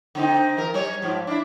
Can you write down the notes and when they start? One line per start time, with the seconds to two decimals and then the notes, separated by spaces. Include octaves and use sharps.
0.15 D3 C4 D#4
0.57 E3 A#4
0.74 G3 C#5
1.02 G#2 F3
1.27 D4 E4